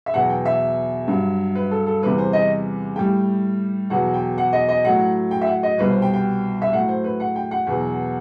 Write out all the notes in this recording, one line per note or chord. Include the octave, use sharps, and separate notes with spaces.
E5
E2 B2 F#3 F#5
G5
E5
G2 F#3
B4
A4
A4
E2 C3 E3 G3 B4
C5
D#5
A2 G3 G5
E2 B2 F#3 F#5
G5
F#5
D#5
D#5
A2 F#3 F#5
G5
E5
F#5
D#5
C2 B2 G3 B4
C5
G5
G5
E5
A2 F#3 F#5
C5
B4
F#5
G5
F#5
E2 B2 F#3